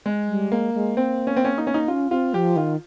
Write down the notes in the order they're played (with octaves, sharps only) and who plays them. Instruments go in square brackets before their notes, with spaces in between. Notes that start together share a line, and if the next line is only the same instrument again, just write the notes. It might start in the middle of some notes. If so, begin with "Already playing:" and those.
[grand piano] G#3
[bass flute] G3
[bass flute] G#3 [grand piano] A#3
[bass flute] G#3
[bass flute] A#3 [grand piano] C4
[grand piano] C#4
C4
C#4
D#4
C#4
D#4
[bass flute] C#4 [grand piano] F4
[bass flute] C4 [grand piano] F4
[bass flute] F3 [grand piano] G4
[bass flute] D#3 [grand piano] F4